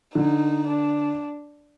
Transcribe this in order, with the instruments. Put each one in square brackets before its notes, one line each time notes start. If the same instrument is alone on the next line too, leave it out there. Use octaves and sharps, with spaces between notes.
[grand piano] D3 [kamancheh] D#4
[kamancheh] D4